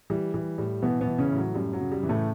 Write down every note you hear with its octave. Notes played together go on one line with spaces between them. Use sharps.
E3 G3
E3 G3
A2 G3
B2 E3 B3
B2 B3
E3
C#3 C#4
A2
F#3
F#2 G3
F#3
C#3
G3
E3
A2 A3